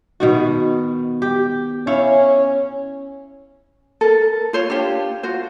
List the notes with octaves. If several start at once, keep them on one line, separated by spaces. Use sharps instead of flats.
B2 D#3 F#4
G4
C#4 E4 C#5 F5
A4 A#4
F4 C5 C#5
D4 F4 G4
F4 F#4 C5